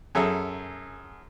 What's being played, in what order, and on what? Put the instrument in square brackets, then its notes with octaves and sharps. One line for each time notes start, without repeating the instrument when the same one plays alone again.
[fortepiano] F#2 G#4 A4 E5 A5 A#5